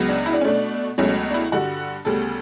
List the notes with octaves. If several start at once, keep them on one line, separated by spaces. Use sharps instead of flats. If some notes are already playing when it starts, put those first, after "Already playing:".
Already playing: C#2 C#3 F#3 B3
D4
E4
D4
C#4
B2 A3 D4
C#2 B2 F#3 A3 C#4
D4
E4
G2 D3 G3 F#4
D2 C#3 G3 B3 A4